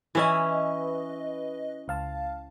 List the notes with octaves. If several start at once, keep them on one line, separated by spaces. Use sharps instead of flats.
E3 C#4 E4 B4 D#5
C#2 F5 A5